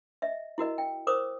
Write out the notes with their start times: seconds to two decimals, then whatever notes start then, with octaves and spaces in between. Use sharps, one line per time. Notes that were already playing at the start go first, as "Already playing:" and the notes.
0.22 D#5 E5
0.58 E4 F#4 A#4 D#5
0.78 G5
1.07 A#4 C5 D6 D#6